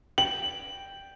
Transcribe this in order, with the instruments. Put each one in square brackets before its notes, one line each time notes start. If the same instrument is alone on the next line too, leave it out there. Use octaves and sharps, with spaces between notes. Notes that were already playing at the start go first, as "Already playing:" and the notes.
[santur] G5 [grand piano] F#7